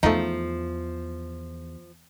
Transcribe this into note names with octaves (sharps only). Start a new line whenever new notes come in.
E2 F3 A3 D#4